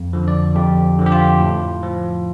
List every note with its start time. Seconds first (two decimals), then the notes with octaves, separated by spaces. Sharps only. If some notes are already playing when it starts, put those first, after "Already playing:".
Already playing: F2
0.13 D3 F3
0.28 D5
0.55 F2 G4
0.99 D3 F3
1.06 G4
1.12 F4
1.40 A2
1.83 F3